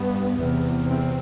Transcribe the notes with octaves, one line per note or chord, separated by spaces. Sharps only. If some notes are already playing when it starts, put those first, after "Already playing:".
Already playing: G2 B3
E2 C3
C4